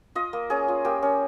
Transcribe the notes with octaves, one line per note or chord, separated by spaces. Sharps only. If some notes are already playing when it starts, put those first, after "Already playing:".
F4 D#5
A#3
C#4 G#4
F4
A#3 G4
C#4